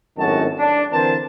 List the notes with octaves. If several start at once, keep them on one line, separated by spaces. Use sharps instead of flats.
G#1 F#2 A2 D#3 F#4 A5
D4
D3 E3 C4 A#4 C5 A5